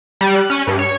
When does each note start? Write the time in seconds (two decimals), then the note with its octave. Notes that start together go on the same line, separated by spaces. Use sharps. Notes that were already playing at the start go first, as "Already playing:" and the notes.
0.21 G3
0.36 F#6
0.50 C#4
0.67 G2
0.79 C#5